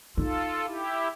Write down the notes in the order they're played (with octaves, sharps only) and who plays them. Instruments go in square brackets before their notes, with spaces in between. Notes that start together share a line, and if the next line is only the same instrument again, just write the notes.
[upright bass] D#4 [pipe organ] F4 A4
[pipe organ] E4 G4